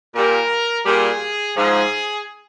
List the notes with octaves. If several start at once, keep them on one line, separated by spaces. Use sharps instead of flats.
A#2 G3 A#4
A#2 G3 G#4
G#2 F3 G#4